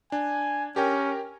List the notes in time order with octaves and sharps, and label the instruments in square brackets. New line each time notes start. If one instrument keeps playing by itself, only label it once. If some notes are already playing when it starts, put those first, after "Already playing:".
[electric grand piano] D4 [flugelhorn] G#5
[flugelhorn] C#4 [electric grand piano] G4 A#4 G5